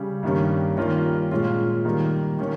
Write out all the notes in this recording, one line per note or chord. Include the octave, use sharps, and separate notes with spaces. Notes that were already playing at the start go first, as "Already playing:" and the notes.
Already playing: C#3 G3
G2 D#3 G3 A#3 C#4
D#3 G3 A#3 C#4 F4
A#2 G#3 C#4 F4
D#3 G3 A#3
D#3 A#3 C#4